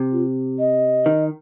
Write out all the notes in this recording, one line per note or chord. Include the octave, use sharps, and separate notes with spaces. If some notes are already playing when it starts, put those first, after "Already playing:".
Already playing: C3
F4
D#5
D#3